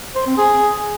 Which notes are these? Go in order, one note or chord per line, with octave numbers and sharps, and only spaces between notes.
C5
C4
G#4